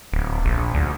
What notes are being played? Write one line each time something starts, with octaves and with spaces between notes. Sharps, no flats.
D1
A#1
D2